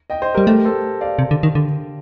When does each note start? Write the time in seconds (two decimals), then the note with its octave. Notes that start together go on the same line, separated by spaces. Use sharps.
0.10 D#5 G5
0.22 C5 D#5
0.35 G3 G4 A#4
0.47 A3 G4 A#4
0.65 A4 C5
1.01 D5 F5
1.19 C3
1.31 D3
1.43 D#3
1.55 D3